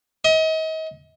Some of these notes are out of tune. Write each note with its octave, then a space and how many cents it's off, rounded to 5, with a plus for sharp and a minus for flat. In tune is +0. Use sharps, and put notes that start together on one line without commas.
D#5 +35